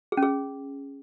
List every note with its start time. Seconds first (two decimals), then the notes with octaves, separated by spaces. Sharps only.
0.12 G#4
0.17 C#4
0.23 G#4